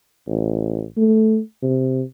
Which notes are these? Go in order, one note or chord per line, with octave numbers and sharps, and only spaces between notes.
A1
A3
C3